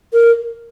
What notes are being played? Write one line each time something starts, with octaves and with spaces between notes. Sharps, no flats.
A#4